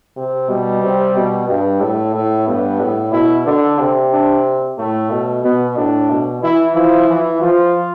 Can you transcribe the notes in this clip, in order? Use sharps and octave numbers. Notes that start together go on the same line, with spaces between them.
C3
B2 G3
C3
B2
G2
A2 A3
A2
G2 B3
A2
B2 E4
D3 D4
C3
D4
A2 A3
B2
B2 B3
A2 D4
B2
E3 E4
F3 E4
E3
F3 F4